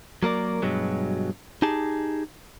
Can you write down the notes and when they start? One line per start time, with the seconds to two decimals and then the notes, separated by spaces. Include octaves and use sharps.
0.23 F#3 A#3 A#4 D5
0.62 G2 B2 F#3 G#3
1.62 D#4 G4 G#4 A5